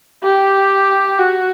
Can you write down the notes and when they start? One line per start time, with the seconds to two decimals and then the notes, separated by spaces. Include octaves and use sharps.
0.23 G4
1.19 F#4